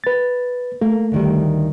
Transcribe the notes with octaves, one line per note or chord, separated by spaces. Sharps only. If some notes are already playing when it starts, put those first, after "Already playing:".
B4 A6
A3 A#3
D2 D#3 G3